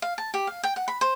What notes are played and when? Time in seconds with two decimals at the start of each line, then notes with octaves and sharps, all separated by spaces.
0.02 F5
0.18 A5
0.34 G4
0.47 F5
0.64 G5
0.76 F#5
0.88 B5
1.01 C5